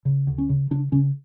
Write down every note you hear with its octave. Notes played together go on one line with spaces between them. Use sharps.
C#3
D2
C#4
C#3
C#3 D4
C#3 C#4